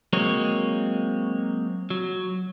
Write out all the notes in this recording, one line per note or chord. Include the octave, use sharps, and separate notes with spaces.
F#3 G#3 A#3 C4 C#5
F#3